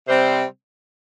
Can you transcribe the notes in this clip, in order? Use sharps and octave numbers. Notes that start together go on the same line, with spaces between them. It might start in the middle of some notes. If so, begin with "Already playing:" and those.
C3 G3 C4 C5